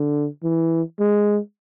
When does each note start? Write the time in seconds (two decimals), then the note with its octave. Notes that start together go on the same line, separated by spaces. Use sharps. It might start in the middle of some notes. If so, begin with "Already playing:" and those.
Already playing: D3
0.43 E3
1.00 G#3